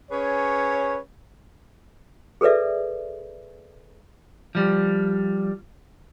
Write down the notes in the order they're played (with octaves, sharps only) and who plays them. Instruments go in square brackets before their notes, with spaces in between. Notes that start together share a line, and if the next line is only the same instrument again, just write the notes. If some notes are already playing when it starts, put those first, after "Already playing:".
[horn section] C#4 G#4 B4 C#5
[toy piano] G#4 A4 B4 D5 E5
[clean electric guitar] F3 G3